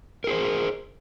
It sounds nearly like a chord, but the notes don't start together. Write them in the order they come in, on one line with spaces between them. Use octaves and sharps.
A#4 G#4 C5